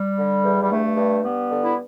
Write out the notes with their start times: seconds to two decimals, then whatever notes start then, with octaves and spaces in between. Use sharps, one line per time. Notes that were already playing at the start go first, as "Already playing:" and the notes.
Already playing: G3
0.18 D3
0.44 E2
0.62 G3
0.70 G2 A3
0.96 G2
1.23 G2 G3 B3
1.50 D3
1.63 E4